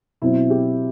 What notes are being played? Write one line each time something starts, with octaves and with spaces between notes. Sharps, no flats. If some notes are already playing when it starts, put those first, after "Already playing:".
B2 F#3 C4 E4
G4